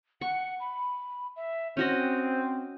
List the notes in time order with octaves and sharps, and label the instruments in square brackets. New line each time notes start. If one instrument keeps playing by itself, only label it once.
[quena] F#5 [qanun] C#6
[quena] B5
E5
[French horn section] C4 [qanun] C#4 F#4 D#5 [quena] G6